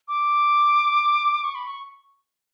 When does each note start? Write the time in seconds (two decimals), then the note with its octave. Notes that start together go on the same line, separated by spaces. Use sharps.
0.08 D6
1.44 C#6
1.55 B5
1.67 C#6